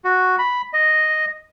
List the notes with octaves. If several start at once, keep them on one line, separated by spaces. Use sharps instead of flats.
F#4
B5
D#5